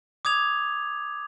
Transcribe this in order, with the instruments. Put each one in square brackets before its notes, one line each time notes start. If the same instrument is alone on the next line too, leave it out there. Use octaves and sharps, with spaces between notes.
[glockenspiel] D6 D#6 G#6 F7